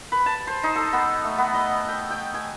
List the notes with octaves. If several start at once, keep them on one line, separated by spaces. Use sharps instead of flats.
B4
A5
C5
D#4
A4
B3
A3
B3
D#5
G5
G5
G#5